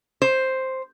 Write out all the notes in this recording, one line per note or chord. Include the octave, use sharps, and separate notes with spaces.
C5